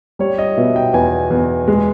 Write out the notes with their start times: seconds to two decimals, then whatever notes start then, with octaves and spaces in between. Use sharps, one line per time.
0.19 G3 C#5
0.38 D#5
0.57 B2 E5
0.76 G5
0.93 E2 G#5
1.30 E2
1.68 G#3